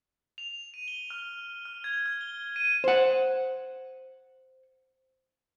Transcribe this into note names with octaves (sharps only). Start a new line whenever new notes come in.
F7
D#7
G7
F6
F6
G#6
F6
G7
D#7
C5 F#5